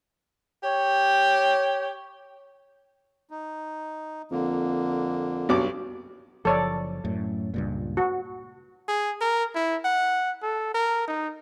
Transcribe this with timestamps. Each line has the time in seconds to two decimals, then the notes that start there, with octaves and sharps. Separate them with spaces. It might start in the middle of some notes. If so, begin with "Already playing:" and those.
0.63 G4 C#5
3.30 D#4
4.31 F2 D3 A#3
5.49 B1 G2 D6
6.45 F#1 F3 A4 C#5 D5
7.05 F#2 A2
7.54 C#2 G2 A#2
7.97 F#4
8.88 G#4
9.21 A#4
9.55 E4
9.84 F#5
10.42 A4
10.74 A#4
11.08 D#4